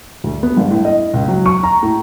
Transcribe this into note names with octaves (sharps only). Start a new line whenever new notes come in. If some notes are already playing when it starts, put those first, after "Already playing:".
D2
B3
G1
A2
D#5
C#2
F#3
C#6
A#5
A2